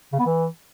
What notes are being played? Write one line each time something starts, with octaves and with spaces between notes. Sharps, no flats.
C#3
B3
E3